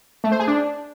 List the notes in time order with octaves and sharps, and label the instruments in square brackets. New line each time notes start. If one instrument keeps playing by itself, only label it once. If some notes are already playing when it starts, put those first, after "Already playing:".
[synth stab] A3
C5
G#4
D4